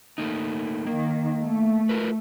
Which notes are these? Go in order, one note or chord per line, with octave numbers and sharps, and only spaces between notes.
A3 A#3 D#4
D#3 A#3
A3
F4 A#4 B4